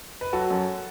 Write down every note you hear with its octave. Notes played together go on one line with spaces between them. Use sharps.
B4
F#3 F#4 A4
F#2